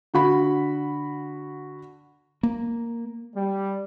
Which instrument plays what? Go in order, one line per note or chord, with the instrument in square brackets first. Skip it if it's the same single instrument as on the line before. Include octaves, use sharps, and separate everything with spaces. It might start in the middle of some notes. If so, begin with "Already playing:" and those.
[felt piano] D3 F#4 B5
[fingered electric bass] A#3
[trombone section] G3